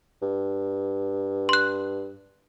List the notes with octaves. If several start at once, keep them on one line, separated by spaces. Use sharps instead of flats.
G2
C6 F#6